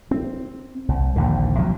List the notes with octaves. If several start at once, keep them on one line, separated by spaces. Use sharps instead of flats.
C4
C2
A#1 D#2 D3
C3 F3 F#3